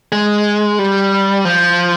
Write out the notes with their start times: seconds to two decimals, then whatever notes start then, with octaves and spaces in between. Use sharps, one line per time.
0.12 G#3
0.79 G3
1.45 F3